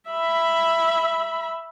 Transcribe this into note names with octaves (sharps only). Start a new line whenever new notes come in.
E5 B5